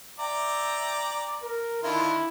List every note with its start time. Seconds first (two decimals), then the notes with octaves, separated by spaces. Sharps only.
0.19 D5 E5 G5 A#5
1.43 A#4
1.83 D3 D#3 E4 F4